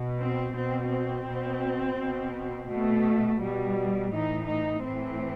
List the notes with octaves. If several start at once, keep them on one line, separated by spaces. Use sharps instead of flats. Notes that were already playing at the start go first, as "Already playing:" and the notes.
Already playing: B2
C4
B2 C4
C4
B2
B2
B2 A3
B2 G3
A2 E3 D#4
D#4
A2 E3 C4